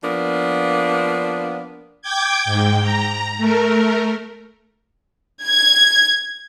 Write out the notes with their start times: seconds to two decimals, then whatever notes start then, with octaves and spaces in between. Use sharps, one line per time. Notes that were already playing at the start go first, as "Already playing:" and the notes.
0.03 F3 A#3 B3 D4
2.02 G5 D6 G6 G#6
2.45 G#2 G5
2.82 A#5
3.38 A3 A#4
5.45 G#6